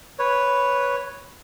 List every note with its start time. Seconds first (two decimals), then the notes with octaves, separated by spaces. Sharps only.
0.19 B4 C#5